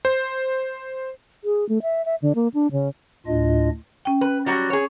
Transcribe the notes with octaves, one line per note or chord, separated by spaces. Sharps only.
C5
G#4
A3
E5
E5
D3
A#3
D4
C#3
D2 A2 D4 F4 D#5
C#4 G5
B4
F#3 G3 F#4
G#4 C#5